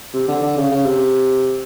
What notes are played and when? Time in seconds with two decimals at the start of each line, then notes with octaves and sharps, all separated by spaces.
0.13 C3
0.28 D3
0.43 D3
0.57 C#3
0.71 C#3
0.85 C3